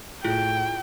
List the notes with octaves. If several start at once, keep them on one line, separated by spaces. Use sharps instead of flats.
A2 E4 F4 G#4 G5